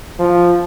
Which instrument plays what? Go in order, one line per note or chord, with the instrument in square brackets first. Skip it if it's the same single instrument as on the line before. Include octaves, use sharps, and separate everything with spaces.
[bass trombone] F3